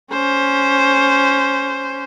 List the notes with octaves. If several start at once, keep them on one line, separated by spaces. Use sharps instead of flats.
C#4 C5